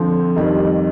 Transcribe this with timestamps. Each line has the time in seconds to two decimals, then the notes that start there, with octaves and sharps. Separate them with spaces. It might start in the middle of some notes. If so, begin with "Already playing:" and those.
Already playing: D3 F3 C4
0.36 F2 D#3 G3